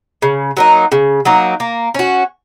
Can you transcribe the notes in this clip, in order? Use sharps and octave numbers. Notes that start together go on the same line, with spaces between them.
C#3
F#3 A#3 D#4
C#3
F#3 A#3 D#4
A#3
C#4 F#4